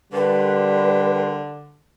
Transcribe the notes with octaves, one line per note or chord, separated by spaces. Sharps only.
D3 G3 A#4 B4 G5 C6